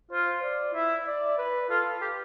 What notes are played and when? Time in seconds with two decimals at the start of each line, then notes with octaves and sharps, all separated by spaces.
0.11 F4 C5
0.43 D5
0.75 E4 E5
1.07 D5
1.38 B4
1.70 F4 A4
2.01 G4